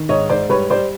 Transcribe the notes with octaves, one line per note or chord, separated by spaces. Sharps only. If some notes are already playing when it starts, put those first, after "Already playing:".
Already playing: D#3
G#2 C#5 D#5
G#2 C5 D5
G3 B4 C#5
G3 C5 D5